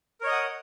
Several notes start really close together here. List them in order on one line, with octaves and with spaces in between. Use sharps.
A#4 C#5 D#5 D#6 F#5